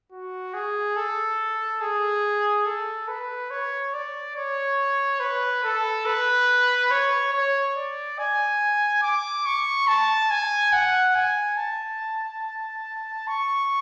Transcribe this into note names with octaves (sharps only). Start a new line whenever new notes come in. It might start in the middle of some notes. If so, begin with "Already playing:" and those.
F#4
G#4
A4
G#4
A4
B4
C#5
D5
C#5
B4
A4
B4
C#5
C#5
D5
G#5
D6
C#6
A5
G#5
F#5
G#5
A5
C#6